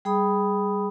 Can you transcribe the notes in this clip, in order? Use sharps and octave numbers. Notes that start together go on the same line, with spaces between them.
G3 G#4 G5 B5 D#6